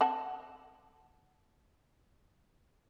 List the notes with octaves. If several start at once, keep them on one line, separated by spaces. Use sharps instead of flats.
C4 F#5 A5